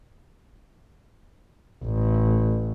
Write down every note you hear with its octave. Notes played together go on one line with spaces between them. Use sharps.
A1